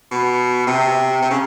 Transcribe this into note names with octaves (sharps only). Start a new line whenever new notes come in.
B2
C3
C3
C#3